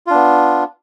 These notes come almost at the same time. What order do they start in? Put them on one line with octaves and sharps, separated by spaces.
F4 D4 B3